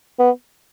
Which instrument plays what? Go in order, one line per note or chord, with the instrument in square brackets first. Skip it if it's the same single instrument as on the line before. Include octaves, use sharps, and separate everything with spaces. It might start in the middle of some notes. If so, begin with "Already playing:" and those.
[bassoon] B3